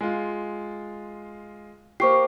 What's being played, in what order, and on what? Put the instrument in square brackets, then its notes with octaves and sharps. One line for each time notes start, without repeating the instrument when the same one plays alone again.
[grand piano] G#3 F4
[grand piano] A#3 G4 [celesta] C5 C#6 C7